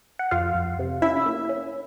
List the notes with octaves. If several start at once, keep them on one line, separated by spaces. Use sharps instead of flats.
F#5
F2 F4 F5
F2
C3
C#4 E4 E5
A#3
C#4